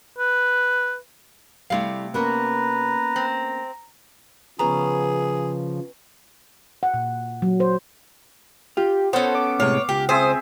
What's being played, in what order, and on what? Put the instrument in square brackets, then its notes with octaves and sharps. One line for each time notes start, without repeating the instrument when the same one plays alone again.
[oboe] B4
[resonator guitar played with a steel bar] C3 F5 [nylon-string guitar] G3 A3 E4
[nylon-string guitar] A#3 B3 C#4 [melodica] B4 [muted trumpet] A#5
[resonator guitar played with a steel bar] C4
[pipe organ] C#3 F3 [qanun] B3 C#4 [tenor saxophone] G#4 [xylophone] A#5
[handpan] F#5
A#2
F#3
C5
[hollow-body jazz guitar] F4 [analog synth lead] G4
[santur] B3 [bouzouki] C#4 A4 [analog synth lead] C5
[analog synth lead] D6
[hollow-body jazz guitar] A2 C3 G#3 [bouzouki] C#5 [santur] F5
[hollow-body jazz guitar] C#2 [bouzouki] G4
[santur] C4 G#4 E5 [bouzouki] C5 [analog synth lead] D#6